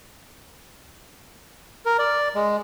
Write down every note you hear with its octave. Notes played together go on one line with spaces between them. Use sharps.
A#4
D5
G#3